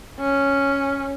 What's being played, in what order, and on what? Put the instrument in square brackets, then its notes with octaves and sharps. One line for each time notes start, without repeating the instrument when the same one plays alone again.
[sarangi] C#4